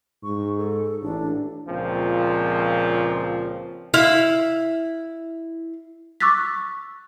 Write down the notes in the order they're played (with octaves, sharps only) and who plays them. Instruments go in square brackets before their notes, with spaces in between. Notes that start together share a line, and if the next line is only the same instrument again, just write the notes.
[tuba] G#2 [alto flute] C#6
[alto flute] A4
[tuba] A1 [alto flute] D4
[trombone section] C#2 A#2 F3 C4
[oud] E4 F5
[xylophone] C#6 D6 E6 F#6 A6 B6